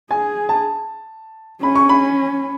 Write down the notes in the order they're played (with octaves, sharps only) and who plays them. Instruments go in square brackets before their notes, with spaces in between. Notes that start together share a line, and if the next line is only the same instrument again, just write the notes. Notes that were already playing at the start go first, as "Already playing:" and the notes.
[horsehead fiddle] G#4 [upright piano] G#5
[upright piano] A5
[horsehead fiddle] C#4 [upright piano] B5
[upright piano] C#6
B5